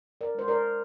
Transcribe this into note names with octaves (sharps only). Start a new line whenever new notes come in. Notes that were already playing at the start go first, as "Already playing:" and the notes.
A#4 D5
G#3 C5
A#4 D5